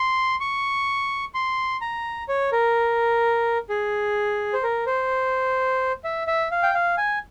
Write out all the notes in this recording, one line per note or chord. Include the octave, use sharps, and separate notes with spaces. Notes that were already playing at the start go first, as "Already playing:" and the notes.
Already playing: C6
C#6
C6
A#5
C#5
A#4
G#4
C5
A#4
C5
E5
E5
F5
G5
F5
G#5